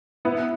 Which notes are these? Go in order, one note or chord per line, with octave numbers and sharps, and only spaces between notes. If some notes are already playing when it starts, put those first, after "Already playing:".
B3 E4